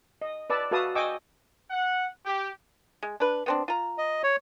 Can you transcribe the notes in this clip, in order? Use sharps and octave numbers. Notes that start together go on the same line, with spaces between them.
D#5
B4 D5 A5 E6
F#4 A4 B4 F5 A5 D#6
D#5 G5 G#5 C#6 D6 E6
F#5
G4
G#3
D4 B4
B3 C4 D4
F4 A#5
D#5
C#5